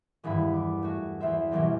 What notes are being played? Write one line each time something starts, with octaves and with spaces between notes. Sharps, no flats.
D#1 E2 G2 E4 B5
D6
A3 F#4
E2 A#3 C5 E5
F#2 B2 E3 G3 A#3 C4